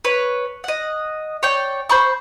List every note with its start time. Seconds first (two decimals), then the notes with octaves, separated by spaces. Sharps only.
0.05 B4 C#5
0.64 D#5 F#5
1.43 C#5 D5 G5
1.89 C5 B5 C#6